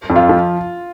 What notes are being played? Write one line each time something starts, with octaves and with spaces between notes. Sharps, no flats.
F2
F4
F3